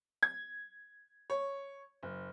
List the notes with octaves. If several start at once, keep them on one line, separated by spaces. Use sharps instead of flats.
G#6
C#5
F#1